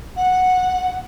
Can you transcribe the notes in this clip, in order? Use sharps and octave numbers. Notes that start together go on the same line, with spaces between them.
F#5